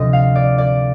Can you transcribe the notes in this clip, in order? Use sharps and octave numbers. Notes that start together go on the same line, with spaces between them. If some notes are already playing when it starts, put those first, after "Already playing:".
Already playing: D2 C3 F3 D#5
F5
D5
D5